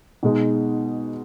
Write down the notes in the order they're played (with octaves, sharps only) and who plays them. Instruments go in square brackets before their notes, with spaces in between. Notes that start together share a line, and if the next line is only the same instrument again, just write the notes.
[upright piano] B2 G#3 D#4